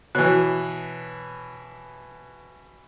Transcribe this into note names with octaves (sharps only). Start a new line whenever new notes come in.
B2 E3 C#5 F#6